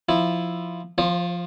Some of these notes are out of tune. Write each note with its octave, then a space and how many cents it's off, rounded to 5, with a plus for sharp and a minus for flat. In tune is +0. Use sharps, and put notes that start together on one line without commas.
F3 +0 E4 +0
F3 +0 C5 +40